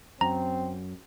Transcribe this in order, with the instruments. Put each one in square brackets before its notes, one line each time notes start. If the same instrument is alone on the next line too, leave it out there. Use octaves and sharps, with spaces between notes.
[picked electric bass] F#2 [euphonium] C4 [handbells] A#5